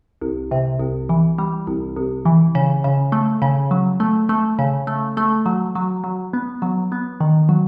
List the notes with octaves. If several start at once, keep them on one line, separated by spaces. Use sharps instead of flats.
C2
C3
C2
E3
G3
C2
C2
E3
C#3
C#3
A3
C#3
F#3
A3
A3
C#3
A3
A3
F#3
F#3
F#3
B3
F#3
B3
D#3
F#3